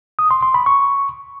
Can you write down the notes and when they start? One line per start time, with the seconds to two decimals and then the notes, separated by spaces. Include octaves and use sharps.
0.19 D#6
0.31 C6
0.42 C6
0.54 B5
0.66 C#6